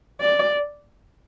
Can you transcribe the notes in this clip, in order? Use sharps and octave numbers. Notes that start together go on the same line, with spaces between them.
D5